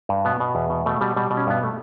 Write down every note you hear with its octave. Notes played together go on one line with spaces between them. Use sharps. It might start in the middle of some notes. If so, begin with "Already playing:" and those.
G2
B2 B3
B2
E2
B2
B2 A3
B2 G3
B2 G3
B2
C#4
G2 B3
A3